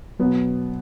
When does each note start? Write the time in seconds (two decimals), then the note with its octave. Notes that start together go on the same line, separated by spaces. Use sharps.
0.19 B2 F#3 B3